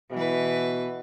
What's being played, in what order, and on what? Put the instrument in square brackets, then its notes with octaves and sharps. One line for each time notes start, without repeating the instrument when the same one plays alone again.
[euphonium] B2 [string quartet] E3 B4